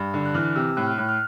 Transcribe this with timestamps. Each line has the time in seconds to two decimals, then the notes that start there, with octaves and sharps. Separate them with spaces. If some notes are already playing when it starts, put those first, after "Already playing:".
Already playing: G2
0.14 D3
0.26 F#6
0.34 E3 F6
0.56 C3 E6
0.77 A2 F#6
0.87 F6
0.98 A2 F#6
1.09 F6